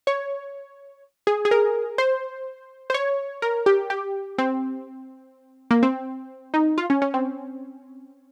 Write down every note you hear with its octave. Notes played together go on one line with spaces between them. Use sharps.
C#5
G#4
G#4
A#4
C5
C5
C#5
A#4
G4
G4
C4
A#3
C4
D#4
F4
C#4
C#4
C4